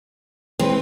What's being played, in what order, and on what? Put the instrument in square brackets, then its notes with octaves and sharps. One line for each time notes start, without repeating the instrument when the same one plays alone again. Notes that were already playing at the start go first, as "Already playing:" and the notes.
[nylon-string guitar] E3 G#3 B4 [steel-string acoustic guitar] C4